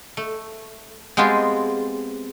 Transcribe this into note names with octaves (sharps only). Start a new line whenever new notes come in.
A3
G#3 B3 C4 F4 G4 G#4